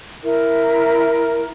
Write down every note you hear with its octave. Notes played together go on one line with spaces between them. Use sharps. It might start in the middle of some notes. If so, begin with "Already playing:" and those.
E4 A#4 E5